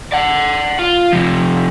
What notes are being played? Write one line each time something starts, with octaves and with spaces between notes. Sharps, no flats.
D5 F#5
F4
C3 F3